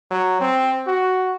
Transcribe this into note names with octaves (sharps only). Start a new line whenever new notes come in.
F#3
C4
F#4